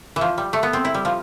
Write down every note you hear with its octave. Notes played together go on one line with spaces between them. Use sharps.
E3
F3
G3
A3
B3
C4
E4
G3
F3